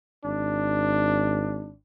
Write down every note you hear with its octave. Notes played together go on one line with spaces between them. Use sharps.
G#1 D4